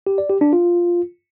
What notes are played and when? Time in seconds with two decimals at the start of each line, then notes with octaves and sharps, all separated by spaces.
0.07 G4
0.18 D5
0.30 G4
0.41 D4
0.53 F4